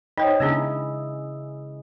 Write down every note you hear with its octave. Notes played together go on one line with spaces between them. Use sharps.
D#4 C5 C#5 D#5 G5
C#3 B3 C#4 D4 E4 G#4 E6